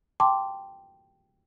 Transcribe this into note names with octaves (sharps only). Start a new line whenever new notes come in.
G5 A5 C6 D6